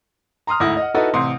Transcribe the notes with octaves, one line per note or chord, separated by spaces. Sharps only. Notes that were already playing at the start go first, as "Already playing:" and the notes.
A#5 C6 D#6 F6
D2 G#2 E4 D#6 A#6
D#5 F#5
D#4 E4 F#4 A4 B4 D#5
A1 C3 C6 D#6